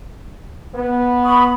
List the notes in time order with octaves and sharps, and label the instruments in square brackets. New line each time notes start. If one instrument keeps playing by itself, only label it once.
[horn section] B3
[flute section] B5 C#6 D#6